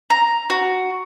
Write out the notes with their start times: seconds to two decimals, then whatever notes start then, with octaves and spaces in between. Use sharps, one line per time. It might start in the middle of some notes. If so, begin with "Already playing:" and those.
0.10 A#5
0.50 F#4